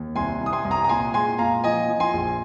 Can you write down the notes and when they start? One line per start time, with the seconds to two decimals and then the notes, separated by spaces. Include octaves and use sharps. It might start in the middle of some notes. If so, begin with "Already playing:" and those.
Already playing: D#2
0.15 C2 G#5 C6
0.41 C2
0.46 D#6
0.53 G#5 C6
0.65 C2
0.71 A#5 D#6
0.84 A#5
0.89 A#2 G#5 C6
1.14 G#3 G#5 C6
1.39 A#2 F5 A#5
1.64 F3 D#5 G#5
1.88 F3
2.00 G#5 C6
2.13 A#1